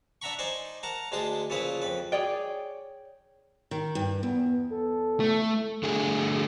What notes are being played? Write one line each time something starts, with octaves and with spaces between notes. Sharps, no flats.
D4 E5 F#5 A#5 B5 C#6
D#4 C5 D5 G#5 C#6
A#4 F#5 A5 A#5
D2 G#3 D4 A5 C6 D#6
A#2 C#3 F3 E4 B4 D#6
F2 B4
G#4 C#5 D5 G5
D#3
G2
E2 B3
A4
A3
D3 A3 G#4